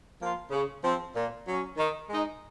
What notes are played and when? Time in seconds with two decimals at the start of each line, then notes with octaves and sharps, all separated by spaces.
0.19 F3 A#3 F4
0.51 C#3
0.83 F3 C4
1.14 A#2
1.45 F#3 C#4
1.77 D#3
2.09 G#3 D#4